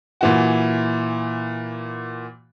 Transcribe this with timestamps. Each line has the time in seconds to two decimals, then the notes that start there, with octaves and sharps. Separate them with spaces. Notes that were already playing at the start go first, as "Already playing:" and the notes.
0.21 A#2 E3 F#4